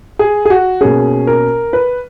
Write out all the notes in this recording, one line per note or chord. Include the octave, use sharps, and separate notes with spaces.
G#4
G#4
F#4
B2 A#3 C#4 G#4
A#4
B4